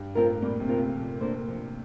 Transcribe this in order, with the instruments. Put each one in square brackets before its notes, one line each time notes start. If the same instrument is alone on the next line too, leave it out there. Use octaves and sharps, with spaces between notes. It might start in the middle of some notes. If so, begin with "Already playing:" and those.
Already playing: [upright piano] G2
[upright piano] A2 [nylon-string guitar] C4 F4 A#4
[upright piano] A#2 [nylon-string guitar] G3
[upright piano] C3
[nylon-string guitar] C4 F4 A#4
[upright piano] C3
[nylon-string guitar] F3
A#3 D4 A4 C5
F3